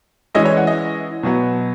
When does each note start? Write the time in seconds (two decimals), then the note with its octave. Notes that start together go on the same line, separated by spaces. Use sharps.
0.35 E3 G#3 C#4 E4 D#5
0.45 C#5
0.57 F#5
0.67 D#5
1.23 B2 F#3 B3